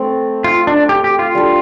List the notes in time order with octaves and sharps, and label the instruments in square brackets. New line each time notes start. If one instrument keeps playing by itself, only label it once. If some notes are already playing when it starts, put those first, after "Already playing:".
Already playing: [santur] A3 C4 A4
[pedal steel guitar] F4
D4
G4
G4
F4
[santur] G3 D4 A4